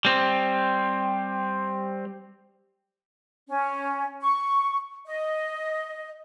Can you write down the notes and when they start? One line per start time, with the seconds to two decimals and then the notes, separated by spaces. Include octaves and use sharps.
0.05 G3 C4
3.49 C#4
4.22 C#6
5.06 D#5